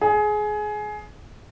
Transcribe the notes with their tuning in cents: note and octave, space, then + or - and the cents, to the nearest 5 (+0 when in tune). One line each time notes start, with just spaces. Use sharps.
G#4 +20